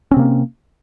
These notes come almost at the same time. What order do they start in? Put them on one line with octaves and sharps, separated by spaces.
C#4 C4 C3 A#3